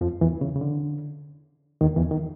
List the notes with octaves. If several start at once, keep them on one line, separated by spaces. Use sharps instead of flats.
F2 F3
E2 E3
C#3
C#3
D3
D#2 D#3
E2 E3
D#3